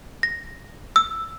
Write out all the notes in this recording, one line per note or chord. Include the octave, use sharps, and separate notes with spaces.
A#6
E6